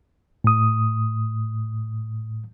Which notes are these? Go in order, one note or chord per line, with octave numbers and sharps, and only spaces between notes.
A2 D#6